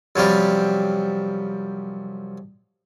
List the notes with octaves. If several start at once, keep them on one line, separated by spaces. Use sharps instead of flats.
F#2 C3 F3 G3